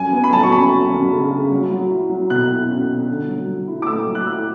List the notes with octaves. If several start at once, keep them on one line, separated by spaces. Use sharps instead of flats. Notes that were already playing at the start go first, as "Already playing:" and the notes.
Already playing: F#2 G#5
B3
B5
F#3 A5
C#6
F#2 B5
F#3
F#2
C#3
C#3
F#3
F#3
E4
F#3
B2 F#6
E4
C#4
B2
D3
F#3
F#3
E4
D6
A3 E6
F#3
F#6
E4 E6